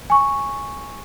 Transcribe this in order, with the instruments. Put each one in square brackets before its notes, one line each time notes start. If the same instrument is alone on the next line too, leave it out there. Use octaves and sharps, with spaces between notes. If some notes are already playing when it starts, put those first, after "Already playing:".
[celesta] G#5 C#6